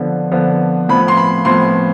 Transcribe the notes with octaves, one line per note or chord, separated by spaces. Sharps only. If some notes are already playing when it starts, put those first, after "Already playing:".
Already playing: D3 F3 B3 D4
D3 F3 B3 D4
A2 F3 B3 B5
C6
B5
A2 F3 B3 C6